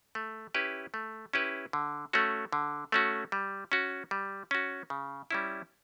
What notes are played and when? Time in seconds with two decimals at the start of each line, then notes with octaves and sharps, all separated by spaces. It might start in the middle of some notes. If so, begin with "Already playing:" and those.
0.15 A3
0.54 C#4 E4 G4 B4
0.94 A3
1.33 C#4 E4 G4 B4
1.73 D3
2.13 A3 C#4 F#4
2.53 D3
2.92 A3 C#4 F#4
3.32 G3
3.72 C#4 F#4
4.11 G3
4.51 C#4 F#4
4.90 C#3
5.31 G3 C#4 E4